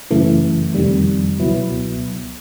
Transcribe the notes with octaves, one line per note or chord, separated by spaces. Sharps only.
F#2 C#3 E3 A3
F2 C3 D#3 G3
C#2 B2 F#3 B3 E4